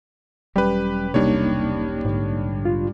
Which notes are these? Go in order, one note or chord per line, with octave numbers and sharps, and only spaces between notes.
E1 F#3 G3 C#4 G4 B4
C2 C3 G3 A#3 D4 D#4 C#5
A#1 G#2 D3
F4